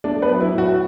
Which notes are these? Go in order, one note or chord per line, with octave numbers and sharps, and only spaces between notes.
A3 D4 D5
B3 B4
F#3
E4
A2
F#4